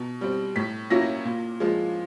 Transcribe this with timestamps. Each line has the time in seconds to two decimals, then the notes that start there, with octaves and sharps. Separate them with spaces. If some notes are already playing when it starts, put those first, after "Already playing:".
Already playing: B2
0.21 G3 C4
0.56 A2 B6
0.90 F#3 A#3 C#4 E4 A#6
1.25 A#2
1.60 F3 G#3